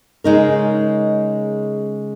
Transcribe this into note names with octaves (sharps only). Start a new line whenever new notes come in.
C#3 G#3 D#4 A#4